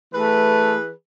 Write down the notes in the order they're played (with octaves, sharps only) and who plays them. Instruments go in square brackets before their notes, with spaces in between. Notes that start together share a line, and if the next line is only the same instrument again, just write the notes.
[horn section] E3 G#4 B4 [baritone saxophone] A3